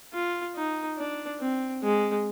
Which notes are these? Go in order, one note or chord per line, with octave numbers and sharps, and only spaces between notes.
F4
D#4
D4
C4
G#3